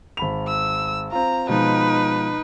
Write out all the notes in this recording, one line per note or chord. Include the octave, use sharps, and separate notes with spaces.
G#1 B5 F7
E6
C4 F4 A#5
B2 F3 G#3 D#4 B4